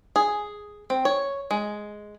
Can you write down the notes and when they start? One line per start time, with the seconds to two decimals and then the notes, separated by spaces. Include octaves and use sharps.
0.16 G#4
0.90 C4
1.05 C#5
1.51 G#3